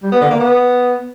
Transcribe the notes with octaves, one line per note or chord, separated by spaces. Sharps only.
G3
B3
D3
A#3
B3